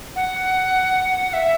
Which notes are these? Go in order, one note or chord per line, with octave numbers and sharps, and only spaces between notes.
F#5
E5